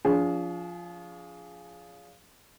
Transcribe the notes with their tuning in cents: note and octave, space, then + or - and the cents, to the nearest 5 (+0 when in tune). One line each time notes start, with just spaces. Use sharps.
F3 +0 D4 -45 G#4 +0